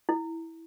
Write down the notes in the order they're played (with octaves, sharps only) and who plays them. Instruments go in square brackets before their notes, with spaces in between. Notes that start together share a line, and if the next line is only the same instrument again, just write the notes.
[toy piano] E4